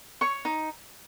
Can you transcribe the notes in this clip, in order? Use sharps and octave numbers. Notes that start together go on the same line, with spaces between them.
C#5 C#6
D#4